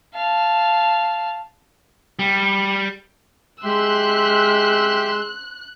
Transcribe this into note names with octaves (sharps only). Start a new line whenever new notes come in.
F5 A5
G3
G#3 G4 E5 C6 E6 F#6